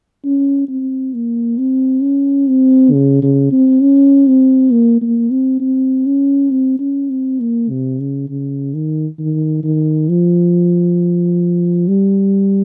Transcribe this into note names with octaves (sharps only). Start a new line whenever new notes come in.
C#4
C4
A#3
C4
C#4
C4
C#3
C#3
C4
C#4
C4
A#3
A#3
C4
C4
C#4
C4
C#4
C4
A#3
C3
C#3
C#3
D#3
D#3
D#3
F3
G3